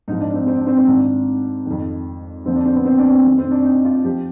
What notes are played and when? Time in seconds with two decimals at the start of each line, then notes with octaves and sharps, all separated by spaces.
0.08 G#2 F3 D#4
0.20 D4
0.34 C4
0.47 C4
0.57 D4
0.67 C4
0.77 C4
0.87 G#2 D#3 D4
1.66 F2 D#3
2.45 F2 D3 F3 C4
2.56 D4
2.65 C4
2.75 B3
2.85 C4
2.98 D4
3.12 C4
3.25 F2 D#3
3.38 C4
3.51 D4
3.64 D#4
3.85 F4
4.04 F3 G4